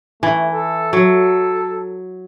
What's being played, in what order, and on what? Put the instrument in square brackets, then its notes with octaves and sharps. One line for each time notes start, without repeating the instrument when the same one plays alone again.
[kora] E3 [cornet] A3
[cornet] A4
[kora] F#3 [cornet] A4